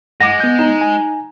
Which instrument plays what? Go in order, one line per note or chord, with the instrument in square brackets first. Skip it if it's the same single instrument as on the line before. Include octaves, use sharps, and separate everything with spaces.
[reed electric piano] G2 [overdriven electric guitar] G#3 [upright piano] F#5 D6 [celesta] A#6
[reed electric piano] B3 G6
[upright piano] D#4 A#5 E7
[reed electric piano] G#5